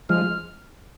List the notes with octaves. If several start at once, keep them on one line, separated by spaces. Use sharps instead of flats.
F3 G#3 F6